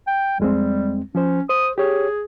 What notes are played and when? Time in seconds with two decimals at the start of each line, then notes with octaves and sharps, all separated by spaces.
0.07 G5
0.40 F2 G3 G#3 C4
1.15 F3 C#4 C5
1.49 C5 D#6
1.78 G4 G#4 C#5